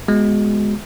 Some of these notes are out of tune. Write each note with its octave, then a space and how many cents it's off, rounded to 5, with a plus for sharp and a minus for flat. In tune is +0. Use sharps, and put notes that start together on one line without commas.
G#3 +5 B3 -5 F#4 +0